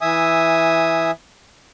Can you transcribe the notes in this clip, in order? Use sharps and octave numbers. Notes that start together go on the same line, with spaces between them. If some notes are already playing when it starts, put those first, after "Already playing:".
E3 E5 G#5 D#6